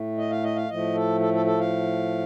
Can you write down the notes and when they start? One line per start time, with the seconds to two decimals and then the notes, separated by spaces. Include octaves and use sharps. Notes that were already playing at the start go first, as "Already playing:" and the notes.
Already playing: A2 A3
0.18 D#5
0.30 F5
0.43 D#5
0.56 F5
0.68 A2 F3 A3 D#5
0.95 A4
1.20 A4
1.33 A4
1.46 A4
1.59 F5